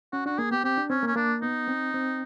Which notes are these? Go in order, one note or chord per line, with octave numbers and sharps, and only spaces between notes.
C#4 F#4
D4 F#4
A#3 G#4
B3 G4
C4 G4
D4
C4 C#4
A#3
C#4
A#3 D4
B3 D#4
C4
C4